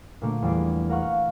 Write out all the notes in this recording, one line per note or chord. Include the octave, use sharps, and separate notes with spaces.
A#2 D3 A3 A#3
E2 G3 D5 C7
A#4 F5 F#5 C#6 F6